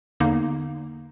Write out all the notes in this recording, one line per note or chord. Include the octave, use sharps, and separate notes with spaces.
E2 D3 A#3 D#4